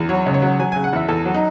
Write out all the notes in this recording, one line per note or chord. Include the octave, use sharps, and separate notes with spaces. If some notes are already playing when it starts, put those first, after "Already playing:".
Already playing: E2
F#3 C#5
C#2
C#5
F#3
F#3 G#5
C#3 G#5
F#5
E2 E5
E2 A4
F#3
D#4